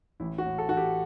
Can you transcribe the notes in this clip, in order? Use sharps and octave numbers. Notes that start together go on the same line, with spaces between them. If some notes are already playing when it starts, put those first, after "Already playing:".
A1 E4
F#4
A2
A4
E3 F#4
G4